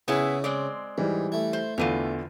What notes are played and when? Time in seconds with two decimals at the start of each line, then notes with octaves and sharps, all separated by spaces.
0.08 C#3 B3 C#4 E4 G#4
0.44 G#3 C4 D5
0.98 G#2 E3 G3
1.32 A3 E4
1.53 C5
1.78 E2 A2 D3 E3 F4 D#7